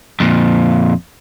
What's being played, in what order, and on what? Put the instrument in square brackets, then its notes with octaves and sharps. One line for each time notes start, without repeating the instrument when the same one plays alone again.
[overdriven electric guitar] F2 A#2